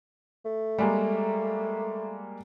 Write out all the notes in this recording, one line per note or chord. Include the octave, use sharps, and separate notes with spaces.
A3
G3 G#3 A#3